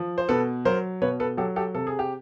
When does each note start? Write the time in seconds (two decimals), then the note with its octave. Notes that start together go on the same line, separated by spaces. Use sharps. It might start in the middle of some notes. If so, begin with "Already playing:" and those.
Already playing: F3
0.18 C5
0.29 B2 A4 B4
0.65 F#3 A#4 C5
1.02 B2 B4 C#5
1.20 A4 B4
1.37 F#3 G4 A4
1.56 G4 A4
1.74 C3 A4
1.87 G#4
1.99 G4